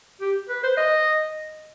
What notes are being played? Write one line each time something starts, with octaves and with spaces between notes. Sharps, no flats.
G4
B4
C5
D#5